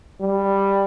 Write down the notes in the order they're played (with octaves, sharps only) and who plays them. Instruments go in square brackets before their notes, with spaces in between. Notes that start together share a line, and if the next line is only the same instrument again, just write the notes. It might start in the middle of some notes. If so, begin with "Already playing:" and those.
[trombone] G3